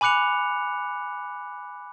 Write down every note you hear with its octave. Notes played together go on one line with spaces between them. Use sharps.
G#5 B5 D6 F#6 C#7 F7